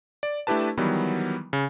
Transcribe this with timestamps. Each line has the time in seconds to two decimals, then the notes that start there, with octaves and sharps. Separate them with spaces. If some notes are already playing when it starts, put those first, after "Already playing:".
0.23 D5
0.47 A3 D4 E4 G4 B4 A5
0.77 D#3 E3 F#3 G3 B3
1.53 C#3